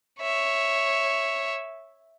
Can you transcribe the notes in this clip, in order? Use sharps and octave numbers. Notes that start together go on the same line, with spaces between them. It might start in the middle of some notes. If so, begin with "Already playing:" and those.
C#5 E5